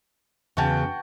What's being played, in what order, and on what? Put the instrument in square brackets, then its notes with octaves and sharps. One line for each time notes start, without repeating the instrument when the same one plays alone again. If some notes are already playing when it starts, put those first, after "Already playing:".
[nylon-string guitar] E2 C#3 [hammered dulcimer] F#4 G5 A5